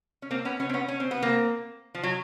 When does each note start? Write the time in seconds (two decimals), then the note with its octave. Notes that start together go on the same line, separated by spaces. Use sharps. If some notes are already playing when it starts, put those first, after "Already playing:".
0.22 C#4
0.31 A#3 C4
0.45 B3 C#4
0.60 B3 C#4
0.69 C4
0.74 B3 C#4
0.88 C#4
1.00 C4
1.11 B3
1.22 A#3 C4
1.95 F3
2.03 F#3